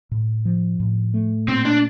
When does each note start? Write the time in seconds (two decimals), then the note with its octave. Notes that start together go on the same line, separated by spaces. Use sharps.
0.11 A2
0.45 F3
0.80 A2
1.14 A3
1.48 A#2 C4
1.65 D4